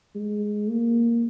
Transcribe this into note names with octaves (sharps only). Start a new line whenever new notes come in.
G#3
A#3